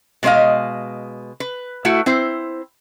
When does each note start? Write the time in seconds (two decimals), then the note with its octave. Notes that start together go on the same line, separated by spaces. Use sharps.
0.23 B2 G#3 C5 D#5 F5
1.40 B4
1.85 A3 E4 F#4
2.06 C4 E4 C5